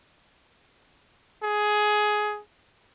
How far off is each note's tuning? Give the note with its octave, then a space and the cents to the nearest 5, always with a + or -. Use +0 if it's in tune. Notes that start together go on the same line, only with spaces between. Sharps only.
G#4 +15